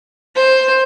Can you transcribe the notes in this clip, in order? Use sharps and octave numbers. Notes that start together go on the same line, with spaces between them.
C5